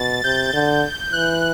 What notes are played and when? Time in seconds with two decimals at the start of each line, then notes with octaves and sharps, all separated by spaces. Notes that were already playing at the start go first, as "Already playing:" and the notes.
Already playing: B2 A6
0.24 C3 G6
0.53 D3
1.12 E3 F#6